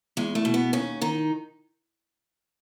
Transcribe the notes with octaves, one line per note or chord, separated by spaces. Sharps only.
E2 G#3
A3
B2
B3
D#2 C#4
D#3 D#4